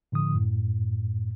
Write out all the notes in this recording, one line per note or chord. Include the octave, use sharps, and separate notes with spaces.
A2 D3 F3 D#6
F#2 A2